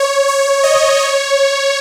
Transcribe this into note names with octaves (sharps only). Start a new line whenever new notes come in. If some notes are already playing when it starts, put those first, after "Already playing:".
Already playing: C#5
C#5
D#5
C#5